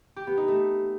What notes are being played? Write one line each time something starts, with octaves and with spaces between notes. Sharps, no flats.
G4
B3
D#4
A3